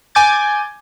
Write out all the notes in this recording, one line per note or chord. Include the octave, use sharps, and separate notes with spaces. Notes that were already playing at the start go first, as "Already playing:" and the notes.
G#5 D6 G6 A6